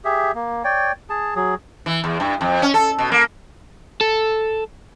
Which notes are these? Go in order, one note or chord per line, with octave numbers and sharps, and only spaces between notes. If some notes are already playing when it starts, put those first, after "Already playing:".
G4 G#4 E5
A#3
C#5 D5 G5
G#4 A5
F#3 G#4
E3
E2
G2
F2
C#4
A4
B2
A#3
A4